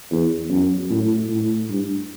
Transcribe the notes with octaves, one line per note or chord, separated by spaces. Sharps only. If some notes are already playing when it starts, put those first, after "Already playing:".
E2
F#2
A2
A2
G2